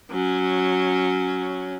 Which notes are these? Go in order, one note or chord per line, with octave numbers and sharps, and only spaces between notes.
F#3 C#4